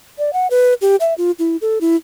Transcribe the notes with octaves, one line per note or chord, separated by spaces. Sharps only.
D5
F#5
B4
G4
E5
F4
E4
A4
E4